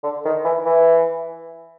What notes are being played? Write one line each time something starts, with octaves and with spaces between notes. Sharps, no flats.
D3
D#3
E3
E3